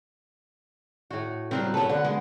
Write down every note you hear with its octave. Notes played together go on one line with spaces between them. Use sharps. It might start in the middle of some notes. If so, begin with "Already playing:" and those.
A2 F#4
C#3 F#3 G3 C4
B3 A4 B4 C#5
D3 F#5
G#3